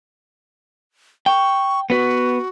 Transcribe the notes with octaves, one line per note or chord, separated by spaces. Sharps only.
G5 C#6
B3 F#4 B4